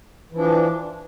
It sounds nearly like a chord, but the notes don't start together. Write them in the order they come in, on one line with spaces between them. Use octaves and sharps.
E3 F3 D4